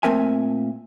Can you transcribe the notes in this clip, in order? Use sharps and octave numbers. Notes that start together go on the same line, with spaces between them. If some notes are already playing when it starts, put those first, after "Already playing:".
A#2 A3 C4 A#4 E5 G#5